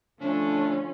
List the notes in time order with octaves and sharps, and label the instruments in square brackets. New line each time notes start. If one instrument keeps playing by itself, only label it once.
[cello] D3 F3 [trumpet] A3 [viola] C#4 [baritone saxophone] D4